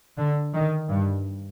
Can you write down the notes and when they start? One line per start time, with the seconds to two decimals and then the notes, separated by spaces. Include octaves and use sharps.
0.17 D3
0.53 D#3
0.89 G2